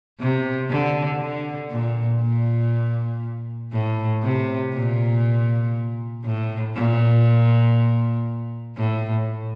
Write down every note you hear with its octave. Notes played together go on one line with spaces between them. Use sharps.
C3
D3
D3
A#2
A#2
A2
C3
A#2
A2
A#2
A2